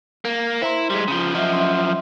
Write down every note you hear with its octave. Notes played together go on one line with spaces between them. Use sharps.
A#3
E4 C5 A#5 C6
G3 G#3 C6 B6
C#3 F3
F#2 F3 D#5 E5
C#4 E5 C6